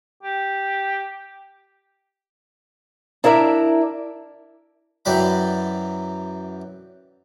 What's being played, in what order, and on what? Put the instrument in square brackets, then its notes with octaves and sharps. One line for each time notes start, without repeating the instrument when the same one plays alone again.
[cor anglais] G4
[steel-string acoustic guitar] D4 E4 A#4 D5 E5
[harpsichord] F#2 E3 F#3 D5 G5 B5